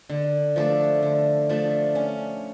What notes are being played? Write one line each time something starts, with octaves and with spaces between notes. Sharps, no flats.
D3
F3 A3 D4
D3
F3 A3 D4
C#4